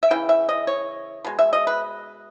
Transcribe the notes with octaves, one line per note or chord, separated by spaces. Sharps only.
E5
C#3 E3 G5
E5
D#5
C#5
B2 G#3
E5
D#5
B4